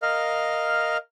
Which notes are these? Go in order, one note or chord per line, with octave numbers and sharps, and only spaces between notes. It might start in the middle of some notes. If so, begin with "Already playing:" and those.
A#4 D#5 F5 F6